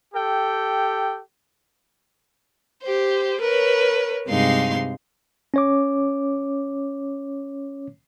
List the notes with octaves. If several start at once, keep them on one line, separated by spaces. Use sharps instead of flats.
G4 A4 G5
G4 C5
A#4 B4 C#5
G2 C3 G#3 D#4 F5 C6
C#4 C#5 D6